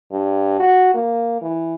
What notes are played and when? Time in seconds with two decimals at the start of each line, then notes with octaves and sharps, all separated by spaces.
0.12 G2
0.59 F#4
0.94 A#3
1.42 E3